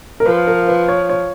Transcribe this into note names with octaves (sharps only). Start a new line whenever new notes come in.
A#4
F3 B4
A#4
B4
C#5
C#5